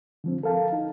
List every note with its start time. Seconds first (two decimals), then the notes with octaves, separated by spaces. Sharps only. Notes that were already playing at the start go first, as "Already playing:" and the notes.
0.24 D3 F3 C4
0.43 A4 A#4 F5 A5
0.73 D#4